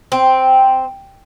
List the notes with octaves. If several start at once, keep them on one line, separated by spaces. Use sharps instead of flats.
C4